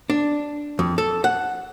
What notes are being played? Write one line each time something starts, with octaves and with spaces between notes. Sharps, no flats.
D4
F2
A4
F#5